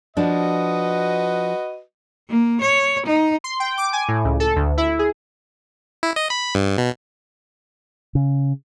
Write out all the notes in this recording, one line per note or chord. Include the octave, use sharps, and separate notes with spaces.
F3 D4 F#4 B4 D#5
A#3
C#5
D#4
C6
G5
D6
G#5
A2
C#2
A4
D2
E4
G#4
E4
D#5
B5
G2
B2
C#3